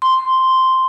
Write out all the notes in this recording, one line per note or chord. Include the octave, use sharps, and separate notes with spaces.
C6